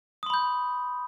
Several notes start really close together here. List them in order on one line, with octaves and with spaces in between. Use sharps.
D#6 C6 B5 G6